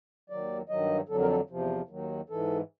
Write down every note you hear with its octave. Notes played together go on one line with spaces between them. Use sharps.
D#2 D#3 F#3 D5
G2 D#3 F#3 D#5
F2 D3 F#3 A4
A#4
A4
E2 C3 F3
D#2 D#3 F#3
G#2 E3 A4